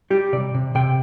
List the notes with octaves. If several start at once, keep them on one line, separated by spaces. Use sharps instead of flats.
G3 G4
C3 D5
C3
C3 G5